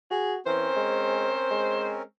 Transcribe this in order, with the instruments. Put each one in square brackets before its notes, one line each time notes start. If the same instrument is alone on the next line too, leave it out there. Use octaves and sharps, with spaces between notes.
[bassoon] F#4 [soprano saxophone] G#4
[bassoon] E3 [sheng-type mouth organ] C4 C#4 A#4 [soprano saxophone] C5
[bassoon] G#3
G#3